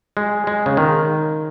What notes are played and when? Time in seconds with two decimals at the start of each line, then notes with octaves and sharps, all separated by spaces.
0.17 G#3
0.47 G#3
0.66 C#3
0.77 D#3